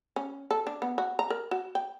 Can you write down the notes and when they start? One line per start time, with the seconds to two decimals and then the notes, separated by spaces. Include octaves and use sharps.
0.16 C#4
0.51 A4
0.67 D4
0.82 B3
0.98 F#4
1.19 A#5
1.30 A#4
1.51 F#4
1.75 G5